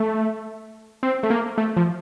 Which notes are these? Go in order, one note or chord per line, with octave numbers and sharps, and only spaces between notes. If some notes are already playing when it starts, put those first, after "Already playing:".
Already playing: A3
C4
A3
A#3
A3
F3